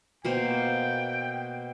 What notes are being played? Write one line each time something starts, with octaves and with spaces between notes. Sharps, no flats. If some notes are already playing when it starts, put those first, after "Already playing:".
B2 A#3 C5 G5